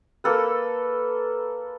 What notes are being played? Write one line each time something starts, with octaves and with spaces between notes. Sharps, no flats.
A#3 A4 B4